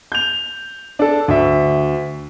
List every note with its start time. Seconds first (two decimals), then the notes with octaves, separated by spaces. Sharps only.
0.12 G6 F7
0.99 D4 A4
1.28 D2 E5